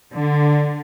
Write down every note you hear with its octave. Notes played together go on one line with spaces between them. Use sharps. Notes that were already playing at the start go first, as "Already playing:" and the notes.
D3